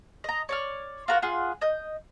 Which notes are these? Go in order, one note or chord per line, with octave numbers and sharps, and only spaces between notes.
D#5 A#5
C#5 D5 F6
F4 F#4 A#4 F#5
F4 G#4 F#5
D#5 G6